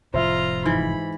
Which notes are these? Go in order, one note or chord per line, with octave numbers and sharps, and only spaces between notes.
F1 A2 F4 C5 E5 A#5
G#2 E3 B5